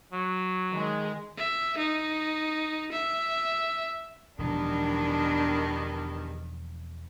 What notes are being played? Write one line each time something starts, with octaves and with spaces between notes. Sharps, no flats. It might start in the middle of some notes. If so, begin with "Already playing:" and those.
F#3
D#3 G#3 G#4
E5
D#4
E5
E1 E2 G2 D#3 F3 D4